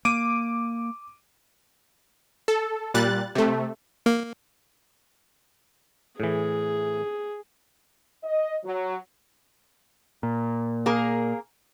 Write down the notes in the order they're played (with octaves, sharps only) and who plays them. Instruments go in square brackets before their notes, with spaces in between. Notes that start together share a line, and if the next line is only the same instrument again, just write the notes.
[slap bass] A#3 [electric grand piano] D6 D7 D#7
[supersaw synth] A4
A#2 G3 F#6 A6
C3 A3
[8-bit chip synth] A#3
[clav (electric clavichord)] A2 E3 [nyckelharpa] G#4
[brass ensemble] D#5
F#3
[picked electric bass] A#2
[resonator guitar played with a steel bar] A#3 G#4 A#4